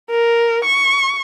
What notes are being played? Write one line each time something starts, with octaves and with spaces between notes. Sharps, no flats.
A#4
C#6